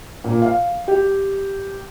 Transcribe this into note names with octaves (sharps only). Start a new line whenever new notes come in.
A#2
F5
G4